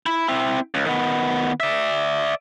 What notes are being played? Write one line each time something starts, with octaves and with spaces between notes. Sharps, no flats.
E4
C4 E4
C#2
D#3 B3
D5 E5